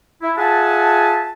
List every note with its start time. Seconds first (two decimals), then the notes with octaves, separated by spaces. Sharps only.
0.22 E4
0.37 F4 G#4 E5 F#5 G#5 A5